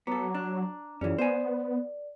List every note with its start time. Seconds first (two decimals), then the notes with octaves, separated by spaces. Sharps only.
0.07 F#3 B3 A4 A#5 D6
0.35 D4
1.01 F#2 E3 C#4 F4 G#4 D5
1.19 B3 B4 C5 D5 G#5